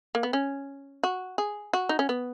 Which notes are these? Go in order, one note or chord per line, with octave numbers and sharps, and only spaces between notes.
A#3
B3
C#4
F#4
G#4
F#4
D#4
C#4
B3